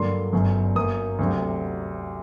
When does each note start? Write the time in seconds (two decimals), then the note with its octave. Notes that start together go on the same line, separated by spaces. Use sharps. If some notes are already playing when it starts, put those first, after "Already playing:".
Already playing: G2 D3 F#3 A#3 C6
0.33 G1 F#2 F#3
0.75 F#2 F#3 A#3 D#6
1.19 D2 C3 F#3